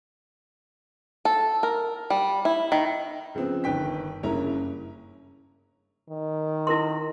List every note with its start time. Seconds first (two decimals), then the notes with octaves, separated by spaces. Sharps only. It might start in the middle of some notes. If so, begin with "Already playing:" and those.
1.25 A4
1.63 A#4
2.10 G3
2.45 E4
2.72 D#3
3.35 C#3 F3 B3 C4
3.64 G1 D#3 B4 G5 B6
4.23 F#1 G2 C#4 E4 A#4 A#5
6.09 D#3
6.67 E4 A#4 C6